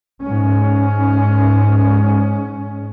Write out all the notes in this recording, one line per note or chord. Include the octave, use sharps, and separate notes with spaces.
G#2 G#3 C#4